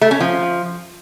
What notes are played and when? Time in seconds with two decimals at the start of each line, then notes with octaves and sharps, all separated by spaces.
0.01 A3
0.11 C#4
0.20 F3